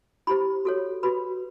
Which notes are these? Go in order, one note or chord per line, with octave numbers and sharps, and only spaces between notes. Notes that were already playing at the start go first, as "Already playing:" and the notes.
E4 G4 C5 B5
F#4 A4 C#5
F#4 B4 B5